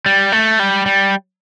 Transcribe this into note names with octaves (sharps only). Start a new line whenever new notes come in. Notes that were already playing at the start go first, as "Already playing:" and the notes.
G3
A3
G3
G3